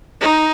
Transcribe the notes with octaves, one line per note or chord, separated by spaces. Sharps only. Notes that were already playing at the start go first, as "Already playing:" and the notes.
D#4